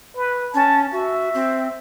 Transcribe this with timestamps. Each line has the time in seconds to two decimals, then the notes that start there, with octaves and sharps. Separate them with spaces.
0.16 B4
0.54 C#4 A5
0.92 F#4 E5
1.34 C4